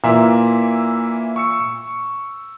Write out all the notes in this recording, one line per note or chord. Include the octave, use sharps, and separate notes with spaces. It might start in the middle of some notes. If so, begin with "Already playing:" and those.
A#2 E3 A#3 E5
C#6 E6 C#7